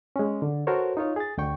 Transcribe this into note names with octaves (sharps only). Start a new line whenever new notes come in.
G#3 C#4
D3
F#4 A4 A#4 C5 C#5
D#4 F4 C#5
G#4 A6
D2 D3 G5 C#6